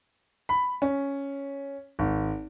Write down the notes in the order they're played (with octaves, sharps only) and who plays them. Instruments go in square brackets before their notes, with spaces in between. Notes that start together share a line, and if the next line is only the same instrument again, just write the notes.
[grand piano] B5
C#4
G#1